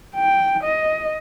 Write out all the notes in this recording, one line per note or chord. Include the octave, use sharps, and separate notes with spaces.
G5
D#5